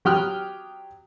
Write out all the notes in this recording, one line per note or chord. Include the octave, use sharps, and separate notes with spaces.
F#3 G4 G5 D#6 F6 F#6